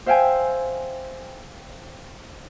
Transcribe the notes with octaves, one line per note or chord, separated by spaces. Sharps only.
C5 E5 F5 G5 G#5